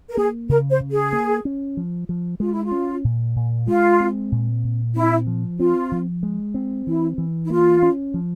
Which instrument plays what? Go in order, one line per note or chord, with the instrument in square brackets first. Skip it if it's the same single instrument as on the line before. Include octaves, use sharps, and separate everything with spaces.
[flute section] A#4
[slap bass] A#3 [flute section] G#4
[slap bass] C#3 [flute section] A#4
[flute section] C5
[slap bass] C#3
[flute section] G#4
[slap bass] A#3
C#4
F3
F3
[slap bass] G#3 [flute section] F4
[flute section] E4
F4
[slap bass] C#4
A#2
A#2
[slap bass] G#3 [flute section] F4
[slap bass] C4
A#2
A#2
[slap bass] C4 [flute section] E4
[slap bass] F3
[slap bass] C4 [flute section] F4
[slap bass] F3
G#3
C4
[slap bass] E3 [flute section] E4
[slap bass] E3
[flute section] E4
[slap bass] A#3 [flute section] F4
[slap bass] C#4
F3